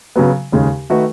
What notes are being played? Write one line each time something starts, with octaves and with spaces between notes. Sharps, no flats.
C#3 F#3 B3
D#2 C#3 G#3
D#3 A3 D#4 F#4 B4